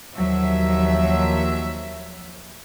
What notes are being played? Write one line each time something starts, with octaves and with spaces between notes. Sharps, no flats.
D#2 F3 F#3 E5